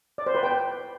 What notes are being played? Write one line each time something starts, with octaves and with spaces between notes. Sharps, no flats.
D5
C5
B4
G5